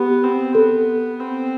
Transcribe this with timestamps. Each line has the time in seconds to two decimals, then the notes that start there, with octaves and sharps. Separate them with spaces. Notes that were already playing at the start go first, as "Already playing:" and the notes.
Already playing: B3 G4
0.23 C4
0.55 B3 A4
1.20 C4